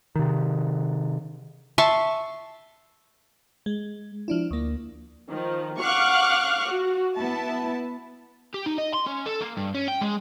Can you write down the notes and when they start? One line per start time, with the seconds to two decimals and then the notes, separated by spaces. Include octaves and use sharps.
0.15 C3 D#3
1.78 E5 A5 C6 C#6
3.66 G#3
4.28 F3 D4 E4
4.51 D2 A#3
5.28 D#3 F3
5.80 F5 F#5 C#6 D6 F6 F#6
6.68 F#4
7.16 B3 E4 A5
8.54 G4
8.66 D#4
8.78 D#5
8.94 C6
9.06 C#4
9.26 A4
9.41 A#3
9.57 G2
9.75 C#4
9.88 G5
10.01 G#3